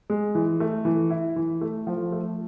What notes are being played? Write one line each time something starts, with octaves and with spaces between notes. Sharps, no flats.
G#3
E3
A3
E3
E4
E3
A3
F3
A3